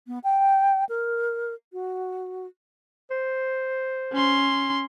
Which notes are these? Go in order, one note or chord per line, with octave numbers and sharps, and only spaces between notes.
B3
G5
A#4
F#4
C5
C#4 C6